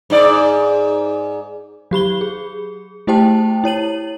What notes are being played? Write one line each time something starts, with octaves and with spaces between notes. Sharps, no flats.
G#2 D#4 D5
F#3 G4 B5 G7
G#4
A3 E4 G4 C5 G5 A5
E4 C#5 D#7 F#7